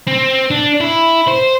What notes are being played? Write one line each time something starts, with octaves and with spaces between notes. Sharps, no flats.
C4
D4
E4
C5